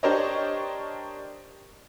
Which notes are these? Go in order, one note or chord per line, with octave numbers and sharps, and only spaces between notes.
D4 G4 A#4 C5 C#5 D#5